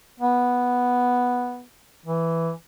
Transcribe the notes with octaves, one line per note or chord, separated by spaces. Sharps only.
B3
E3